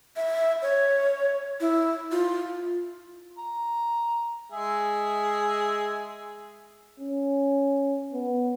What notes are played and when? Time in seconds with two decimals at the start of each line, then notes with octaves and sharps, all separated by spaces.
0.16 E5
0.62 C#5
1.61 E4
2.12 F4
3.38 A#5
4.52 G#3 G#4 E5
7.00 C#4
8.13 B3